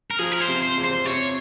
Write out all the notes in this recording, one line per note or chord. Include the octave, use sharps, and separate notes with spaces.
A#4
F3 G#4
A#4
C5
C3
C5
E2
C5
C3 C#5